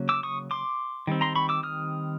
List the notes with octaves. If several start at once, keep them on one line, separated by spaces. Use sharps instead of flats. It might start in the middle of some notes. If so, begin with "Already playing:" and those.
Already playing: C#3 F#3 A#3
D6 E6
C#6 D#6
C6 D6
D#3 G3 C4
A#5 C6
B5 C#6
D6 E6
D#6 F6